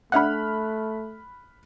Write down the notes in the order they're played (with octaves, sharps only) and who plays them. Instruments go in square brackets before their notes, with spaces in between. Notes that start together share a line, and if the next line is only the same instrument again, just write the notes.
[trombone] A3 [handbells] D4 E5 F#5 [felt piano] B5 F6 F#6